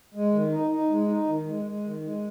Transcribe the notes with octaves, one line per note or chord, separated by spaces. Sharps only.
G#3
D#3
D#4
D#4
G#3
D#4
D#3
G#3
G#3
D#3
G#3